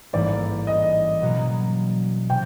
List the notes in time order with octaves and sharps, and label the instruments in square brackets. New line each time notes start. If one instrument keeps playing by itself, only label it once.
[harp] A1 G#2 E3 G3 A#3 [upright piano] D5
[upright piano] D#5
[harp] B2 F#3 A#3 C#4
[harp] C3 [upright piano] G5